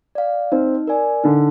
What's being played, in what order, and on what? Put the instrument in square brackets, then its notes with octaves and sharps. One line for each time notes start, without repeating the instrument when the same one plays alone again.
[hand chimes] D5 F5
[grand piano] C4 [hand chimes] D#4
[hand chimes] A#4 D5 G#5
[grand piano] D3 [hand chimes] D#4